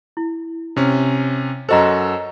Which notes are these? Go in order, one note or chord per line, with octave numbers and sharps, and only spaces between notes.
E4
C3 C#4
F#2 F#4 A4 C5 D#5 A#5